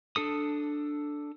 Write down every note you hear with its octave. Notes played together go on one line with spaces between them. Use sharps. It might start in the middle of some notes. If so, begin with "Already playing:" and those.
D4 A4 D#6